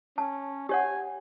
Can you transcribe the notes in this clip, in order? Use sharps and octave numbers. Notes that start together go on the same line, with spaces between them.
C#4 A5
G4 C#5 F#5 G#5